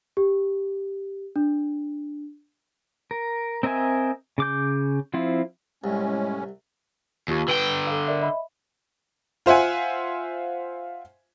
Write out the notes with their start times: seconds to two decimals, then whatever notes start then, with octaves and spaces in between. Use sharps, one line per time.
0.17 G4
1.36 D4
3.11 A#4
3.63 C4 A#4 D#5 E5 G#5
4.38 C#3 D6 G6
5.14 F3 C4 E4 F4
5.84 C2 A2 G#3 C#4
7.28 D#2 F4 G4 C#6
7.48 D3 B4 G5 G7
7.87 A4 F5
8.07 A#4 D5 E5
8.21 D#5 E5 B5
9.46 F4 C5 E5 F#5 G#5